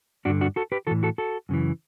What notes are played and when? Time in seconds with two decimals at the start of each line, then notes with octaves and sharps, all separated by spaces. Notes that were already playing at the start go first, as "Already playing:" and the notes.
0.25 G2 D3 D4 F#4
0.41 D4 F#4
0.56 F#4 A4
0.72 G4 B4
0.87 A2 E3 F#4 A4
1.03 F#4 A4
1.18 F#4 A4
1.49 F#2 C#3 E3